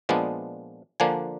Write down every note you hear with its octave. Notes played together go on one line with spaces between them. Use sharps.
A#2 F3 G#3 B3 D4
D3 F3 A#3 D4 G#5